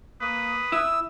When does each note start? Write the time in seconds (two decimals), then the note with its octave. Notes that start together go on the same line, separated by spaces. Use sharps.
0.21 A#3 B4 D#6
0.72 E4 E6